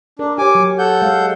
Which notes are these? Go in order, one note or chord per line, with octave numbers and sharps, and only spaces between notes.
D4 A#4
G4 C#5 G#5 D6
F#3
A4 F#5 G6
G#3 C#5 F5